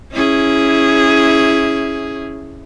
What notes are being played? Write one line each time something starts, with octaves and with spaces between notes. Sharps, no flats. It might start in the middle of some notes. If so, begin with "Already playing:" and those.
C#4 E4 G#4